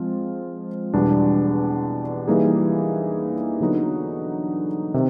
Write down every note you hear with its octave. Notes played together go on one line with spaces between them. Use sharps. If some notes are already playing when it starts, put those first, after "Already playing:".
Already playing: F3 G#3 C4 F4
E2 B2 G3 B3 D4
E3 G3 A#3 D#4 G#4
D3 F#3 B3 D#4 F#4
C3 D#3